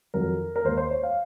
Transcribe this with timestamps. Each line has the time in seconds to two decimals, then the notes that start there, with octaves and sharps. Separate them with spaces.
0.14 F2 D#3 F#3 A#4
0.56 A#4
0.64 D#2 D#3 A#3 C5
0.77 C5
0.91 C#5
1.03 F5